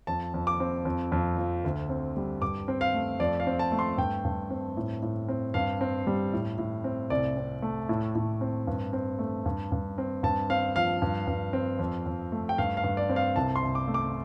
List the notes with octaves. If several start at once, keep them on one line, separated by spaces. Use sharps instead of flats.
F2 A5
F2
D6
C4
F2
F2
F3
D2
C4
G3
G2 D6
C4
F5
A3
F2 D5
F5
C4
A5
A3
C6
G2 G5
G2
C4
A2
A2
C4
G2 F5
C4
G3
A2
A2
C4
C2 D5
C4
A3
A2
A2
C4
G2
C4
A3
G2
G2
C4
G2 A5
C4 F5
F3 F5
G2
G2
C4
F2
F2
A3
G5
G2 F5
F5
G2
D5
C4
F5
C2 A5
C6
C2
D6
A3
D6